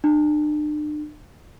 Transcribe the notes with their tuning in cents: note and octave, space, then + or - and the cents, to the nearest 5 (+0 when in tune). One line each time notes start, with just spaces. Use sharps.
D4 +40